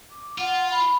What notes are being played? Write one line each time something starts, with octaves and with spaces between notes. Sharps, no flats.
D6
F4 F#5
B5